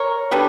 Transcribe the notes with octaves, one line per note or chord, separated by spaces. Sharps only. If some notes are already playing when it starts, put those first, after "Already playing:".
Already playing: A#4 C#5
D3 G3 B3